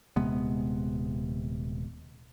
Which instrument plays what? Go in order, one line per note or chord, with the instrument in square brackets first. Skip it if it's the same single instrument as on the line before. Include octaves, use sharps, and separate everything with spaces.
[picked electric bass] D#1 C3 G#3 B3